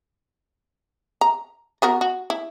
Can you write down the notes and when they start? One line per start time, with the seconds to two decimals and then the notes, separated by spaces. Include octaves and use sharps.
1.21 A#5
1.82 B3 F#4 A#4
2.01 F#4
2.30 E4